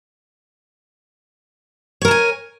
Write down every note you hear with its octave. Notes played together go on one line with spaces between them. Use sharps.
A#4 C#5 G#5 A5